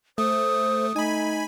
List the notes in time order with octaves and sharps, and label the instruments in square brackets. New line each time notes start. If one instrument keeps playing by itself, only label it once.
[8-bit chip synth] A3 [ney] C5 [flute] D#6
[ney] A3 [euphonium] D#4 [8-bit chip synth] G#5 B5